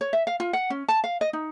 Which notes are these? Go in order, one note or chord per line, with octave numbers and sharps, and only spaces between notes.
C#5
E5
F5
F4
F#5
C#4
A5
F5
D#5
D#4